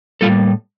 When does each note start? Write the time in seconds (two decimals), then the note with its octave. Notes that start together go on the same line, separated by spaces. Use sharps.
0.21 A2 G3 A#3 F4 A4